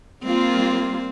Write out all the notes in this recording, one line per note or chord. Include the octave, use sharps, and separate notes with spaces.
G3 A#3 C4 F4